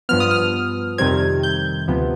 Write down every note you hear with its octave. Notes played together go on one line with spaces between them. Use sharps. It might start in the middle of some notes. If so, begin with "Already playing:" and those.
G2 F3 B3 F6
D#6
F6
F2 C3 D#3 G3 C4 G#6
G6
D2 C3 F3 B3